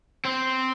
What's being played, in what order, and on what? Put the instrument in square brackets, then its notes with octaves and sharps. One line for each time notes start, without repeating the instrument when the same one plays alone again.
[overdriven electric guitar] C4